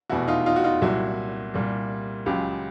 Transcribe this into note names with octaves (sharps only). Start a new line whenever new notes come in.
F1 E2 B2 E4 F#4
D#4 F4
D#4 F4
F#4
D#4 F4
C2 A#2 F#3 E4 F#4
C2 A#2 G3
C#2 C#3 F#3 F4 G4